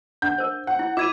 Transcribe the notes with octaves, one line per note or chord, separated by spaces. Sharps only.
D4 F#5 G6
A#4 C5
F#5
E4
E4 F4 D6 G#6 D#7